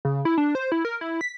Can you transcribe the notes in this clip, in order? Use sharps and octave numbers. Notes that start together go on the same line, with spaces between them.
C#3
E4
D4
C5
E4
A#4
E4
B6